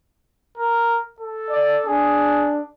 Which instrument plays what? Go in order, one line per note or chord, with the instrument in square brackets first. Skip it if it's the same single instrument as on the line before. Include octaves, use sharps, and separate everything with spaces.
[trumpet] A#4
A4
[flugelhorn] D5
[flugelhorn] D4 [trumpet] G#4